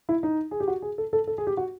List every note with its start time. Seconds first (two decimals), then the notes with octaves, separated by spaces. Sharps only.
0.09 E4
0.23 D#4
0.51 G#4
0.60 G4
0.68 F#4
0.82 G#4
0.98 A4
1.13 A4
1.27 A4
1.38 G#4
1.47 G4
1.57 F#4